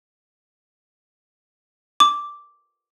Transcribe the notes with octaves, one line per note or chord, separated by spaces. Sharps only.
D6